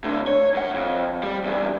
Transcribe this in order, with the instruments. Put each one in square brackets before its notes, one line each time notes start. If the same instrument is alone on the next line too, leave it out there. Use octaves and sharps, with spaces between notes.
[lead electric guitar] A2 D3
C#5
F#2 F#5
F2
G3
E2 G2